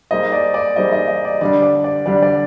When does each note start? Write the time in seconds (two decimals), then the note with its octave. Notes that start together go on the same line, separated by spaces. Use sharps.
0.11 G3 A#3 D#4 G#4 C5 D#5
0.32 D5
0.54 D5
0.76 G3 A#3 D#4 G#4 C5 D#5
0.93 D#5
1.08 D#5
1.25 D5
1.41 D3 G3 D4 D5
1.62 D5
1.84 D5
2.06 D3 G3 D4 D5
2.23 D5